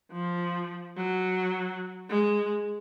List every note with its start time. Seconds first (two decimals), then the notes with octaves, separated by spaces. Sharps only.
0.12 F3
0.97 F#3
2.09 G#3